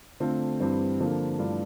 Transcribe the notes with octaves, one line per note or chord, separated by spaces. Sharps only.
D3 A3 C4 F4
G2 E3 G3 C4
D3 F3 A#3 F4
G2 E3 A3 D4 F4